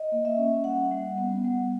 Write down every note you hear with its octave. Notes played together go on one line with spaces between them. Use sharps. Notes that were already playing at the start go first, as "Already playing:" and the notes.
Already playing: D#5
A#3
E5
C#4
G3 F#5
G3
B3
G3